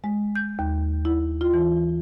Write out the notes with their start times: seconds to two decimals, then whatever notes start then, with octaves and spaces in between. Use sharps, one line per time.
0.04 G#3
0.35 G6
0.59 D#2
1.05 E4
1.41 F4
1.54 E3